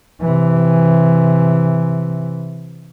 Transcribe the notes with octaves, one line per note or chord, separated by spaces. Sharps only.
C3 E3